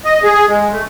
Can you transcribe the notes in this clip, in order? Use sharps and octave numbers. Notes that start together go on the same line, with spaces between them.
D#5
G#4
G#3
A3